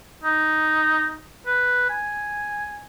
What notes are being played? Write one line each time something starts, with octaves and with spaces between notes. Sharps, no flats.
D#4
B4
G#5